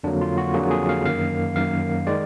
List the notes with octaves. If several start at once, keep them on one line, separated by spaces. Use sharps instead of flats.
F2 D3 F#3 A#3 D4
F4
F#4
F2 D3 F#3 A#3 G#4
G#4
F5
F#2 D#3 A#3 F5
F#2 D#3 A#3 F5
D#3 G#3 D5